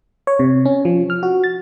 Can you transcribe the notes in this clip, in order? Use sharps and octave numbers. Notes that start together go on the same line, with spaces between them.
C#5
C3
C#4
F3
F6
F#4
A6